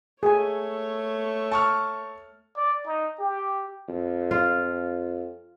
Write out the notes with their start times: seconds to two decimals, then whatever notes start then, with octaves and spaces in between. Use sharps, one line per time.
0.23 A3 G#4 C#5 G#5
1.51 A5 C#6 F6
2.57 D5
2.86 D#4
3.19 G4
3.88 F2
4.31 F4